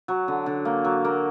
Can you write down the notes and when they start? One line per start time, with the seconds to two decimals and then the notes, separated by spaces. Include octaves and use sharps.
0.08 F#3
0.28 D3
0.46 D3
0.65 A#3
0.84 F#3
1.05 A#3